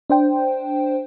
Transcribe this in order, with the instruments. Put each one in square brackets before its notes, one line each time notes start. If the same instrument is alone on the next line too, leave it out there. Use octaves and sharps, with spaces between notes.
[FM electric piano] D4 C5 G5